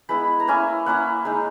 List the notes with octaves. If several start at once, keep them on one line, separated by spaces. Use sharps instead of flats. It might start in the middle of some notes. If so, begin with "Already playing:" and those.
G#3 B3 E4 B5
A#5
A#3 C#4 E4 G#5
A#3 C#4 E4 F#5
G#3 D#4